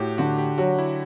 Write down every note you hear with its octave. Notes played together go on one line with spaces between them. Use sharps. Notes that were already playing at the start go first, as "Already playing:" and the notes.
Already playing: A2 F#4 G4
D3 F#4
G4
F#3 F#4
E4